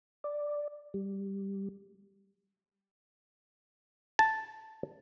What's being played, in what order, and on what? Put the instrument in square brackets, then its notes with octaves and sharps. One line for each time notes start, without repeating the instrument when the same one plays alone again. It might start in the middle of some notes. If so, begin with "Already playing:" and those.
[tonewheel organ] D5
G3
[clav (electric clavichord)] A5